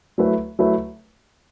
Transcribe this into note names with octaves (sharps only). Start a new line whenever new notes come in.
F#3 A3 E4 B4
F#3 A3 E4 B4